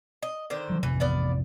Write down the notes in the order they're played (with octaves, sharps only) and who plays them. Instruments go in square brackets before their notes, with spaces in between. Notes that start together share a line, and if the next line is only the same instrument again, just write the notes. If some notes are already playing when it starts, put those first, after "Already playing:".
[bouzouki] D#5
D3 D#3 C5
[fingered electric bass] E3 F#3
[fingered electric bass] A1 F2 C3 [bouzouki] E3
[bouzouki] B3 D5 F5